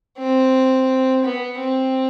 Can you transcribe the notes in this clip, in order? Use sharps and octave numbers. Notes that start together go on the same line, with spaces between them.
C4
B3
C4